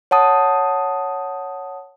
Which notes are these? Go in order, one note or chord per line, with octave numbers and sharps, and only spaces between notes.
C#5 F#5 A5 D#6